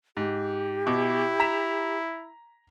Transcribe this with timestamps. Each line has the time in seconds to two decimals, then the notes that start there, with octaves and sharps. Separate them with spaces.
0.17 G#2 G4
0.87 B2 E4 D6
1.40 A#5 B6 E7